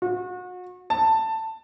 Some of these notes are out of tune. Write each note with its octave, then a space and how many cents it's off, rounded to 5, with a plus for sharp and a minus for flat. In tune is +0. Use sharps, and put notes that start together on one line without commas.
F#4 -35
A5 +15